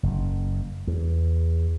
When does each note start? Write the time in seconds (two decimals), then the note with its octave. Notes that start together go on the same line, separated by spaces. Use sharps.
0.03 F#1
0.87 E2